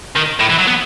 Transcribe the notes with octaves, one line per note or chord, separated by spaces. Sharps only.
D#3
A2
E3
F#3
B3